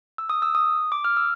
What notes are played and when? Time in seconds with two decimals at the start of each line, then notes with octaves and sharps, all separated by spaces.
0.18 E6
0.29 D#6
0.42 E6
0.55 D#6
0.92 D6
1.05 F6
1.17 E6